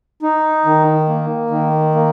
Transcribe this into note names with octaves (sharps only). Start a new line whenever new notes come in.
D#4
D#3
A#3
D#3
A#3